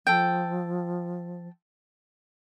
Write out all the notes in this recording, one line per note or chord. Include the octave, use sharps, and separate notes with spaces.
F3 A4 G5